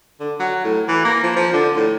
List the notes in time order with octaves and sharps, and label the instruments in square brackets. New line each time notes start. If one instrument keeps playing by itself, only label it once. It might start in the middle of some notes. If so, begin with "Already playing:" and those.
[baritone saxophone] D3
F#3
A2
E3
A#3
F3
F3
D3
A2